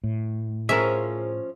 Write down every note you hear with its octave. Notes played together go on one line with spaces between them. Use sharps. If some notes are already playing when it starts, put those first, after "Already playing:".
A2
F3 C#4 G#4 A#4 C#5 E5